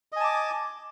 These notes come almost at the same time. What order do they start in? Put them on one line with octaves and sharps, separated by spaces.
D#5 G#5 A5 D6